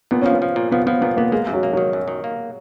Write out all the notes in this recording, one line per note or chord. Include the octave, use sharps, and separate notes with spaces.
A#2 B3
F3 C#4
B3
F3
A#2
F3 B3
F3 B3
A#2 B3
A#3 B3
G#3 A#3
F#2
F#3
A#3
D#3 F#3
F#2
D#3
A#3